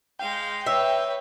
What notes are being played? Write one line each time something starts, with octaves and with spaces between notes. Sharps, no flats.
G#3 F5 G5
B4 C#5 E5